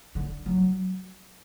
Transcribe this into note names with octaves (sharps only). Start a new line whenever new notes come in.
D3
F#3